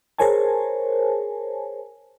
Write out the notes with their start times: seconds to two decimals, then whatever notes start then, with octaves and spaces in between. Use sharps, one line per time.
0.18 G#4 A#4 C5 C#5 G#5 A5